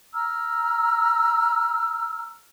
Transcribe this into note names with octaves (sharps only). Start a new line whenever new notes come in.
A#5 E6 F6